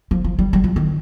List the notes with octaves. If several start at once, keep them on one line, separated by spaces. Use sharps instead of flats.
F3
F3
G3
G3
F3
D#3